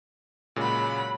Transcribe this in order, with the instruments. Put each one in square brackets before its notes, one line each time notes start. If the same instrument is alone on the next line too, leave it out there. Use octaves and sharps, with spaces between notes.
[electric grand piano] A#2 C#3 G#3 [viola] F#3 B5